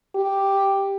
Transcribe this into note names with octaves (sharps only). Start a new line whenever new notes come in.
G4